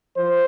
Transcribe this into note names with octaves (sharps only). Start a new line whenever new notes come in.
F3 C5